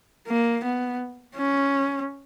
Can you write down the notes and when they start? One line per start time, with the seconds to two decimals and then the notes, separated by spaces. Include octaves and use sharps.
0.28 A#3
0.64 B3
1.35 C#4